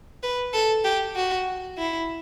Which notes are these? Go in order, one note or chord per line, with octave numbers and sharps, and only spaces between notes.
B4
A4
G4
F#4
E4